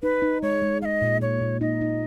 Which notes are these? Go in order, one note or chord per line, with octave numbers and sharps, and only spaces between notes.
D#4 B4
D#4
G#3 C#5
G#3
G#3 D#5 F5
A#2
A#2 C#5
A#2
D#4 D#5
D#4